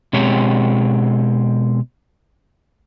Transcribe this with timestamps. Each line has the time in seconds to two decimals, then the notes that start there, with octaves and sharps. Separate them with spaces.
0.13 B2 G#3 C4 G4 C#5